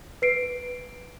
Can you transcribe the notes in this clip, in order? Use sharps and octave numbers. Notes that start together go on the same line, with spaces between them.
B4 C7 D7